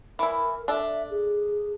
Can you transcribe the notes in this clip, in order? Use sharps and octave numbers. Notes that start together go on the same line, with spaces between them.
E3 E4 A#4
D4 A4 E5
G#4